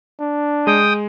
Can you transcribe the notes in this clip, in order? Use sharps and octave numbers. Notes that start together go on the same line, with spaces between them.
D4
G#3 G5 D#6